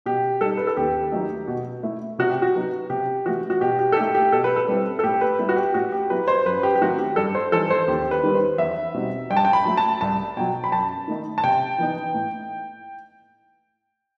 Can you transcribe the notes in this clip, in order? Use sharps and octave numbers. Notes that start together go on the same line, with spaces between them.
B2 G4
G3 D#4 A4
B4
A4
D#2 G4
D#3 F#3 A3 D#4
B2
A3 E4
C3 F#4
G4
F#4
F#3 B3 D#4
C3 G4
E3 A3 F#4
F#4
B2 G4
G4
A4
A3 D#4 G4
G4
B2 A4
B4
A4
G3 C4 E4
A4
A2 G4
B4
G3 B3 E4 B4
F#4
G4
A2 F#4
G4
F#3 B3 E4 B4
C5
F#2 B4
G4
G4
D#3 F#3 A3 C4 F#4
G4
G2 A4
C5
E3 G3 D#4 A4
C5
D#2 G4
B4
D#3 G3 B3
C5
E2 E5
B2 G3 C4 D#4
G2 G5
A5
G5
B5
F#3 A3
A5
C2 A5
B2 F#3 G5
B5
F#2 A5
D#3 A3 D#4
A5
C3 G5
E3 B3 D#4
A2